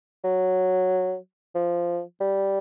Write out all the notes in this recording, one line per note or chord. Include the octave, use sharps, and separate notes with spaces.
F#3
F3
G3